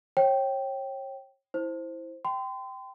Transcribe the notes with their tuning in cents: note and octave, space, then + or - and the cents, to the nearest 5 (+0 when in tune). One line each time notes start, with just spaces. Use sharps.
C#5 -35 G5 -10
E4 -10 C5 +0
G5 -10 C6 -40